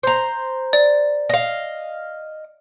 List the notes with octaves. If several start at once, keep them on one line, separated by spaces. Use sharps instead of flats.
C5 A#5
D5
D#5 F5